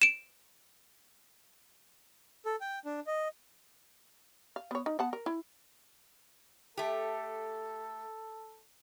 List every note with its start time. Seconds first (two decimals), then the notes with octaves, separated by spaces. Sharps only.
0.02 D7 E7
2.46 A4
2.61 G5
2.85 D4
3.07 D#5
4.56 F5
4.71 B3 C#5
4.86 D#4
4.99 B3 F#5 A5
5.13 A#4
5.26 E4
6.77 A3 G4 A4